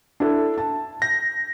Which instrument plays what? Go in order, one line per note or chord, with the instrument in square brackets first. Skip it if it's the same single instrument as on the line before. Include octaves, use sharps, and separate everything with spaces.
[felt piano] D4 E4 A4
A5
[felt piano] G6 [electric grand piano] A#6